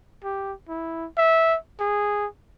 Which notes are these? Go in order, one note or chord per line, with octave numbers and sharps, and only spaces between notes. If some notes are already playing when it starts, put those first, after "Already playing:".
G4
E4
E5
G#4